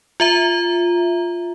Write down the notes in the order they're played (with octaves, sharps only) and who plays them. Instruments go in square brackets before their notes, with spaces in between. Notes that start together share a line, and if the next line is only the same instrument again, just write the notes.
[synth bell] F4 E5 A#5